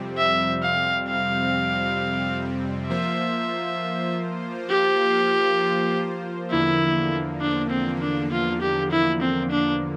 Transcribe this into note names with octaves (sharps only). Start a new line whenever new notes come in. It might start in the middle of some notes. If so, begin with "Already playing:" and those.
Already playing: F2 C3 G3 C4
E5
F5
F5
F3 A#3 F4 C5 E5
G4
E2 D3 F3 A#3 E4
D4
C4
D4
F4
G4
E4
C4
D4